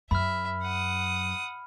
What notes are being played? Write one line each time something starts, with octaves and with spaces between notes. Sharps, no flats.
F#2 E5 B5 F6
F#5 D#6